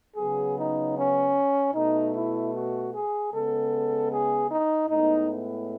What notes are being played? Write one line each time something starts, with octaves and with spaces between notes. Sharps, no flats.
C#3 F#3 B3 G#4
D#4
C#4
B2 A3 D#4
E4
F#4
G#4
C#3 G#3 B3 A4
G#4
D#4
A2 G#3 B3 D#4
E4